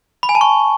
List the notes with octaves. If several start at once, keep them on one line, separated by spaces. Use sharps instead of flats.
B5
G#5
A5
C#6